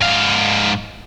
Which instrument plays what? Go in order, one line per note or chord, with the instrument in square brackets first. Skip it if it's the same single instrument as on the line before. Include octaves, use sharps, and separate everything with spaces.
[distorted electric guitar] G#2 F5